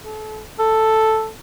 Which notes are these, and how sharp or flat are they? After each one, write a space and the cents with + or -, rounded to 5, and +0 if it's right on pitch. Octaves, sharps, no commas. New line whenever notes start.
A4 -35
A4 +0